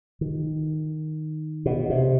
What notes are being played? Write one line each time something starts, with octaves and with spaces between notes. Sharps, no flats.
D#3
B2
C3